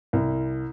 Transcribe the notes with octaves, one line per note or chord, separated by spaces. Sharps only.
C2